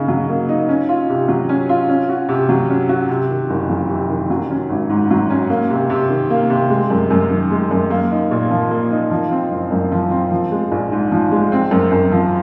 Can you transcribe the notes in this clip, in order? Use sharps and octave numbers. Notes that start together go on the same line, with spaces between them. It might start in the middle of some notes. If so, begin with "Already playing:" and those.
Already playing: C#3 A#3 D#4
F#3
A#3
D#4
C#4
F4
C3
F#3
C#4
F4
C#4
F#4
C3
F#3
C#4
F#4
C3
D#3
F#1
F2
C3
D#3
F#3
C#4
G#1
G#2
F#3
C#4
A#3
C3
C3
D#3
A#3
C3
G#3
F#2
F#2
D#3
G#3
F#2
A#3
D#4
A#2
F3
A#3
D#4
F3
C4
F#1
F#2
F3
C4
F3
G#3
A#1
G#2
F3
G#3
C4
F#2
F#2
F3